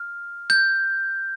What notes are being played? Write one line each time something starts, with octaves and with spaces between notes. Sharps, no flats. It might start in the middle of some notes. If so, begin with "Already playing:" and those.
Already playing: F6
G6